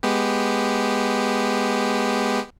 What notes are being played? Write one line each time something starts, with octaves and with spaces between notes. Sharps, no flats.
G#3 B3 G4